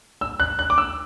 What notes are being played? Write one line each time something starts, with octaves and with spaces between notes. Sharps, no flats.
E6
F#6
F#6
D6
E6